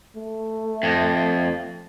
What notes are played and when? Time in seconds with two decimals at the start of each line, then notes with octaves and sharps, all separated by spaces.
0.16 A3
0.83 F2